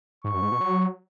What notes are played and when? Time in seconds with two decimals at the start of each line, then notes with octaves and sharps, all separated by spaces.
0.24 G#2 C#6
0.34 F#2
0.42 G#2
0.52 B2
0.60 F#3